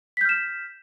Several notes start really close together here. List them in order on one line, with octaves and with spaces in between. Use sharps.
B6 G6 F6 E7